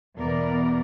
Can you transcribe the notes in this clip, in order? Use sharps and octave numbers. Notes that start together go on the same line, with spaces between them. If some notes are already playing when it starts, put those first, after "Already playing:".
E2 B2 B3 A#4 D5